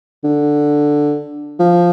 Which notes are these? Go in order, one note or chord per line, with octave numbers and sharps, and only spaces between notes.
D3
F3